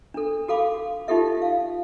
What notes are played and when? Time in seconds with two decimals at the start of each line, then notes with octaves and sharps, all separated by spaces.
0.14 D4 A4
0.48 F#4 A4 F5 B5 D6
1.08 D#4 F4 G4 A4 E5
1.42 F5